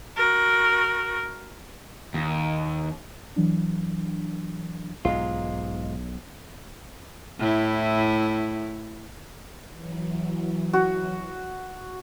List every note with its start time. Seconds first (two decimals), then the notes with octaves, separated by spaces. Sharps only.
0.16 F#4 A#4
2.14 D#2
3.36 E3 F#3 D4
5.05 B1 G#2 G#3 F4
7.39 A2 E4
9.74 E3 F#3
10.73 F#4